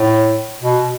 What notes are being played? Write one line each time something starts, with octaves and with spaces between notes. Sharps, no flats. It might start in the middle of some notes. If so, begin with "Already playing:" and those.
Already playing: A2
B2